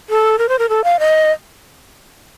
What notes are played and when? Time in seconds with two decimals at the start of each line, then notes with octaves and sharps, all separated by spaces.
0.09 A4
0.39 A#4
0.49 C5
0.59 A#4
0.69 A4
0.84 F5
0.99 D#5